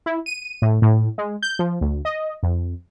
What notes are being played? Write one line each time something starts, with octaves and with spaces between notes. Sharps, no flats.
E4
D#7
A2
A2
G#3
G6
F3
D2
D#5
F2